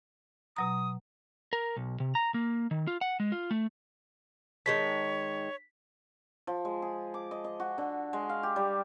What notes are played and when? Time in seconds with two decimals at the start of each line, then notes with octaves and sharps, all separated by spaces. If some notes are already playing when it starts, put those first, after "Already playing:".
0.57 B2 F#3 A#5 D#6
1.53 A#4
1.76 B1
2.00 C3
2.15 A#5
2.34 A#3
2.71 D#3
2.87 F4
3.01 F#5
3.20 G#3
3.32 F4
3.51 A3
4.66 D#3 G#3 C#5 A5 B6
6.47 F3
6.65 G#3
6.82 G#4
7.14 D6
7.31 D#5
7.44 D#5
7.60 F#4
7.78 D3
8.13 G#3
8.29 F5
8.43 G4
8.56 G3